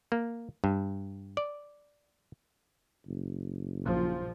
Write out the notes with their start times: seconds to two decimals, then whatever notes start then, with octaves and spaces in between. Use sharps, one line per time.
0.12 A#3
0.64 G2
1.37 D5
3.07 F#1
3.86 A#1 F3